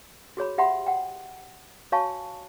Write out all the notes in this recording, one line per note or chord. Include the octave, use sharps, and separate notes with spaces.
F#4 G#4 C#5 B5
G4 E5 F#5 B5 C6
F#5 G5
F#4 C#5 F5 G#5 A5 C#6